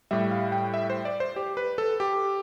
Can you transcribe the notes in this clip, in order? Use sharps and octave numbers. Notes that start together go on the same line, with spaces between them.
A2 G3 E5
F5
G5
E5
C5
D5
C5
G4
B4
A4
G4